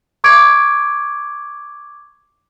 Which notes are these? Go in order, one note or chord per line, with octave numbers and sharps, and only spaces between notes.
C#6 D6 G#6 D7